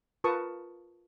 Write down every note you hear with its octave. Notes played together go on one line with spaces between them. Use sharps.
F4 A#4 B4 A5 C#6 D#6